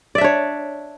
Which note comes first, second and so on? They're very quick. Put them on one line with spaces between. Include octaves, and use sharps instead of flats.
D5 E5 D4 C#5